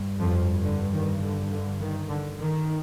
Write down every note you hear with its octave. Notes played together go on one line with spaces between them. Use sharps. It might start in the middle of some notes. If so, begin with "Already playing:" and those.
Already playing: G2
F2 F3
D3
D#3
D3
D3
D#3
D3
D#3